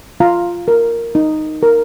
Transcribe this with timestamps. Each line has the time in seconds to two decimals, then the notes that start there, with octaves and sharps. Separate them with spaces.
0.20 F4 F5 A#5
0.68 A#4
1.15 D#4
1.63 A#4